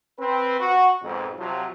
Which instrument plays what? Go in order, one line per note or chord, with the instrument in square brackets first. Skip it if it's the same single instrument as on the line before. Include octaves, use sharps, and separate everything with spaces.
[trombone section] C4 B4
F#4
B1 F2 G#2
C3 F3 F#3